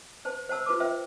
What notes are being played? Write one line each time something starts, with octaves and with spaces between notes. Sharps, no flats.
B4 C5 A5
C5 F#5 A5 E6
F4 B4 A5 D6
F4 B4 C5 E5 G5